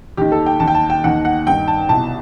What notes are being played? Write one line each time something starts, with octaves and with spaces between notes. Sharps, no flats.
D#2 D#3 G4
A4
G5
D#2 D#3 A5
G5
A5
G5
D#2 D#3 F#5
F#5
G2 D#3 G5
A5
C2 B2 A5